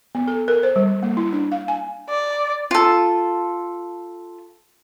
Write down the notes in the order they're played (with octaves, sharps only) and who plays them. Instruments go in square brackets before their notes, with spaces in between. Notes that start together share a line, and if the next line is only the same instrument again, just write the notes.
[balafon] B3
A4
A#4
C5
G3
A#3
E4
D4
F5
G#5
[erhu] D5
[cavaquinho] F4 A4